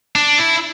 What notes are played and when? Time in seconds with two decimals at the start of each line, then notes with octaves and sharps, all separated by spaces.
0.15 D4
0.38 E4